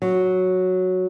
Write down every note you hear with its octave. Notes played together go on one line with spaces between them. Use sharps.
F#3